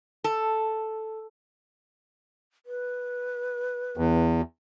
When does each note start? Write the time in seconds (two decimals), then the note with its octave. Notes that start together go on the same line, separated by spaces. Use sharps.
0.24 A4
2.66 B4
3.97 E2